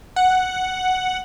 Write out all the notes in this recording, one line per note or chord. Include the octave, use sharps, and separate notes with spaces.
F#5